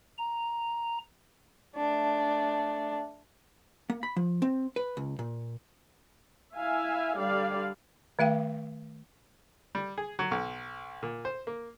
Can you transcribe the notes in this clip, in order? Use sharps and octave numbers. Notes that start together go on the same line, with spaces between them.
A#5
A3 D4
A#3
B5
F3
C4
B4
C#2
A#2
E4 E5 F5 G#5
D3 G3 D5 F5
D#3 A3 F5 G5
G3
G#4
F#3
B1
A#2
C5
A#3